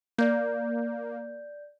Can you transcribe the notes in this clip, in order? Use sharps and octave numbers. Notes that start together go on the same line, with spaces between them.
A#3 D5 G6